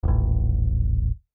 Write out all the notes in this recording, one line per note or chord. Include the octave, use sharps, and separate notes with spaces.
D#1 A1